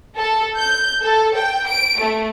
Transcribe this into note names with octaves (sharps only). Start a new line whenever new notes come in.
A4
G6
A4
G5
D7
A3